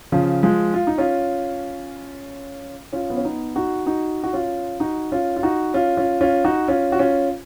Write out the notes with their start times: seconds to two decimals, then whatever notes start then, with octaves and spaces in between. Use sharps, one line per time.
0.12 C#3 F3
0.43 F3 G#3
0.74 F4
0.87 D#4
0.98 C#4 F4
2.93 C#4 F4
3.10 B3
3.17 C#4
3.24 B3 D#4
3.56 D#4 F#4
3.86 D#4 F#4
4.24 F#4
4.33 C#4 F4
4.80 D#4 F#4
5.12 C#4 F4
5.37 F4
5.43 D#4 F#4
5.74 C#4 F4
5.97 C#4 F4
6.21 C#4 F4
6.45 D#4 F#4
6.68 C#4 F4
6.92 F#4
6.99 C#4 F4